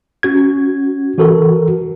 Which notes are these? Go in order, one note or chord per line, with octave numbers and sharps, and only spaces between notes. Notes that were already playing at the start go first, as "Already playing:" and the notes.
C#4 F#4 G#6
E3 F#4 A4 A#4